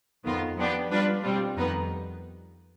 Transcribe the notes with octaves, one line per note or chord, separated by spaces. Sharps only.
F2 D#3 B3 F4
F3 B3 D4 G4 B4
G3 D4 F4 B4 D5
B2 G3 C4 F4
F2 D#3 B3 D#4 B4